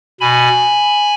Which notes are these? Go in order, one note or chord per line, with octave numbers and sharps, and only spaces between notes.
B2 G#5 B5